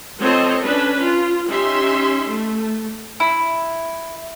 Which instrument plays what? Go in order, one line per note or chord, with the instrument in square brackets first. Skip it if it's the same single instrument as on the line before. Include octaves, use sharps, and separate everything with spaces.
[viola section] F3 C4 A4 C5 C#5 D#5
C#4 D4 B4
F4
C#4 D#4 G4 E5 C6
A3
[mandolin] E4